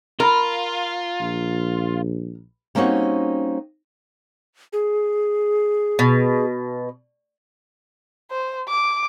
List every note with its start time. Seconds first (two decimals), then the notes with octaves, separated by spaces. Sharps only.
0.20 F4 A#4
1.21 A#1
2.75 G3 A#3 C4 C#4 D#4 F#4
4.73 G#4
5.99 B2
8.31 C5
8.69 D6